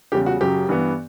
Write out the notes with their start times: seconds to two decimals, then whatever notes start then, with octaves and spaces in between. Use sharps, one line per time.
0.12 E2 C#3 G3 G4
0.26 F#4
0.41 F#2 C#3 F#3 G4
0.68 G2 E3 B3